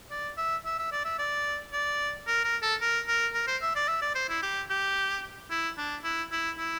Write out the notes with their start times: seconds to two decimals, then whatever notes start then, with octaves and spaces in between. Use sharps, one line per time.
0.11 D5
0.37 E5
0.65 E5
0.79 E5
0.92 D5
1.05 E5
1.18 D5
1.73 D5
2.27 A#4
2.44 A#4
2.62 A4
2.81 A#4
3.08 A#4
3.34 A#4
3.47 C5
3.62 E5
3.75 D5
3.88 E5
4.02 D5
4.15 C5
4.29 E4
4.42 G4
4.70 G4
5.50 E4
5.77 D4
6.04 E4
6.32 E4
6.58 E4